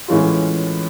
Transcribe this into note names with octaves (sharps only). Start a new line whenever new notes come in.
A2 E3 G#3 C#4 F4